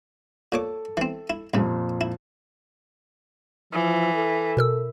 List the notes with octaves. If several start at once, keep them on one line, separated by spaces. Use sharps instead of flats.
A#2 A4 C#5 D6
E3 C4
E4
C2 F2 A#2 C#3
E4
E3 F3
A4
B2 A#4 E6